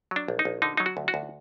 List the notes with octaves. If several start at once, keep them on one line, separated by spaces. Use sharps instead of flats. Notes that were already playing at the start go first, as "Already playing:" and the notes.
F#3 D4
A#1
D#4
A#1
D3 D#4
F#3 D#4
F#4
D2
F#4
D2